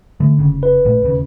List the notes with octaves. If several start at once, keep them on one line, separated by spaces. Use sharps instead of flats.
D3 E3 A3
F1 C#3
B4
A1 A#2 A3
E1 D#2 C#3